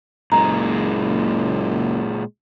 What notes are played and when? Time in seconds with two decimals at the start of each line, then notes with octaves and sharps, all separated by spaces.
0.32 F#1 A#2 G#3 A#5